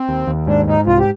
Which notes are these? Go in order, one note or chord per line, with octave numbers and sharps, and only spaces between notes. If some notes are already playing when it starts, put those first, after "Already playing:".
Already playing: C4
D#2
D#2
G#2 D4
G#2 D#4
C2 F4
G4